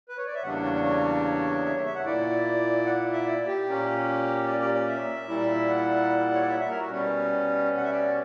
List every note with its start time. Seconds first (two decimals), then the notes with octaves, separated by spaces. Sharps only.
0.09 B4
0.17 C#5
0.26 D5
0.34 E5
0.43 E2 C#3 G3 A#3 D4 F#5
0.63 C#5
0.74 C#5
0.84 C#5
1.65 E5
1.75 C#5
1.85 E5
1.95 F#5
2.05 A#2 A#3 E4 D5
2.86 F#5
3.13 E5
3.26 D5
3.46 G4
3.66 A#2 A#3 C#4
4.47 D5
4.60 D5
4.74 D5
4.88 E5
5.28 A#2 G3 A#3 E4
5.68 F#5
6.34 C#5
6.42 D5
6.49 E5
6.60 E5
6.70 A#4
6.80 F#4
6.90 B2 G3 C#4
7.77 F#5
7.84 E5
7.91 D5